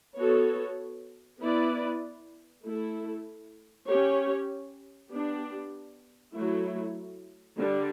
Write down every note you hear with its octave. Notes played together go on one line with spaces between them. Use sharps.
B3 F#4 A4 C#5
B3 E4 B4 D5
A3 E4 A4
C#4 G4 C#5
B3 D4 G4
F#3 A3 E4
D3 G3 D4